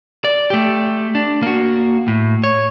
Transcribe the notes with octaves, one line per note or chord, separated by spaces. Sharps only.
D5
A3 G4
D4
A#3 F#4
A2
C#5